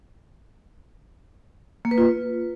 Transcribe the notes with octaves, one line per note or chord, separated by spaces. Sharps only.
A#3
B4
F4